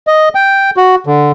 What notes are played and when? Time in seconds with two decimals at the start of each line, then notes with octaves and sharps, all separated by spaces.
0.07 D#5
0.35 G5
0.77 F#4
1.06 D3